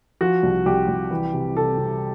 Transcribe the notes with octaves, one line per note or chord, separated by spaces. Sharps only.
F3 F#4
C2
C2 G4
C2
E3
C3
C3 A4
C3